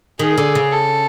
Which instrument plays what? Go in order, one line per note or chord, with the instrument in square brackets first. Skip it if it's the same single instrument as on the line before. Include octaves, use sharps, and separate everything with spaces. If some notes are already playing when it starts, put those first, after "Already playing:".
[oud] D#3 [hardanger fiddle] G#4
[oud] D3
C#3
[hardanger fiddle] A4